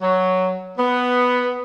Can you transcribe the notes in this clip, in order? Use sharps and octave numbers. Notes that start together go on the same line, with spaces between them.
F#3
B3